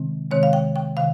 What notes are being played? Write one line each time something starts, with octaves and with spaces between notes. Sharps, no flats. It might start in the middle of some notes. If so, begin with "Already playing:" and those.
Already playing: C3 D#3 G#3 C4
C3 D#3 G#3 C4 C#5
F5
G5
G5
C3 D#3 F5